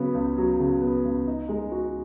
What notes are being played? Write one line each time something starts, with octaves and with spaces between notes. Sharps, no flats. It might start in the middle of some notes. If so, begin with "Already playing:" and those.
Already playing: C#3 F#3 B3
C#2
F#3
C#3
B3
C#2
D#4
G#3
F#4